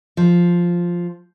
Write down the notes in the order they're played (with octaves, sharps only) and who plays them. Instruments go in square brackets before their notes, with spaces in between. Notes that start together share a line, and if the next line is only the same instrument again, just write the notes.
[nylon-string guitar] F3